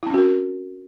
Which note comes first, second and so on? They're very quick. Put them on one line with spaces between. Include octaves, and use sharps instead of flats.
E4 C4 C#4 F#4 A#4